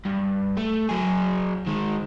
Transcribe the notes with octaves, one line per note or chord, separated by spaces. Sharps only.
G2
A3
F#3 G#4
D#3 G#3